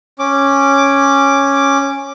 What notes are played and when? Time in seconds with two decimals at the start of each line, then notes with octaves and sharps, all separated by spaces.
0.19 C#4 D6